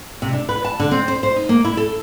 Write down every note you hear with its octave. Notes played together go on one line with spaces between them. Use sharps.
C3
D4
B4
A5
D3
C4
C5
C5
D#4
A#3
E4
A4